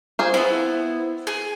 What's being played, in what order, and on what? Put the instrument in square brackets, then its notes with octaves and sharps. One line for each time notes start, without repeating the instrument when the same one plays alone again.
[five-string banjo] F4 G#4 C5
[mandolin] B3 E4 [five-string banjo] C4
[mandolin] G#4